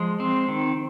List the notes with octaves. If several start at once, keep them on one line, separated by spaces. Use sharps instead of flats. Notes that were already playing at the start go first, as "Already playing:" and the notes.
Already playing: F3 G#3
C4
D#3